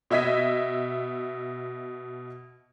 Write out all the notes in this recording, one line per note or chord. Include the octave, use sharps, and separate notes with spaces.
B2 D#5 E5 G#6 B6 D#7